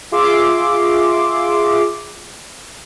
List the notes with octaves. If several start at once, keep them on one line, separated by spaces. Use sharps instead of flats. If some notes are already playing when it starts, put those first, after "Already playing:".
F4 G#4 E5 C6 D6